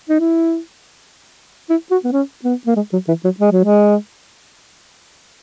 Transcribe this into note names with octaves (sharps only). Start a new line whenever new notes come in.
D#4
E4
E4
F#4
B3
C#4
B3
A#3
G#3
F#3
E3
F#3
G#3
F#3
G#3